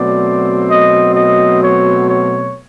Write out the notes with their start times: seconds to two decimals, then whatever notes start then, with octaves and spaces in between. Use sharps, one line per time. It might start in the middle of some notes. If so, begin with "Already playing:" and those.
Already playing: B2 F#3 A3 C4 D5
0.69 D#5
1.15 D#5
1.62 C#5
2.08 C#5